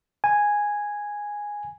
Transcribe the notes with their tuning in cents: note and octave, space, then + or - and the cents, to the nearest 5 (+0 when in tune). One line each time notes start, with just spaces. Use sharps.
G#5 -5